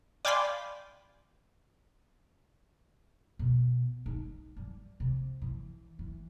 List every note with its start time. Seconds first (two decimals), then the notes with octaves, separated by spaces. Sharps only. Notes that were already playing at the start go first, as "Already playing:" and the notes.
0.25 D5 F5 G5 G#5 B5 C6
3.39 B2
4.06 D#4
4.57 G3
5.00 C3
5.41 E3
5.99 E3